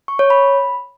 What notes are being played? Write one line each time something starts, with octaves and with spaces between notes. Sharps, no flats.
C#6
C#5
B5